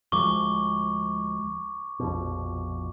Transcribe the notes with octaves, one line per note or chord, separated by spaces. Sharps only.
D2 F3 G#3 C#6 D6
A#1 F2 B2